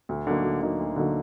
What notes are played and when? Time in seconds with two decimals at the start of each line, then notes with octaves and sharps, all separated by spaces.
0.09 D2
0.27 D3 F#3 A#3 D#4
0.44 D2
0.61 D3 F#3 A#3 D#4
0.79 D2
0.96 D3 F#3 A#3 D#4